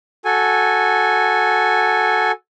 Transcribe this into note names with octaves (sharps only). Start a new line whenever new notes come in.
F#4 A4 G#5